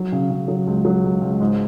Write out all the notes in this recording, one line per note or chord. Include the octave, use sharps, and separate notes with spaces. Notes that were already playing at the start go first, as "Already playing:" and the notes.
Already playing: F#3
C#3
C#3
F#3
C#2
F#3
C#2
C#2
G#2